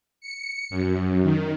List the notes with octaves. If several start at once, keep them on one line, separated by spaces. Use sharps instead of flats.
C#7
F#2
D#3